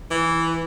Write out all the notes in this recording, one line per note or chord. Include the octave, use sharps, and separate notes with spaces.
E3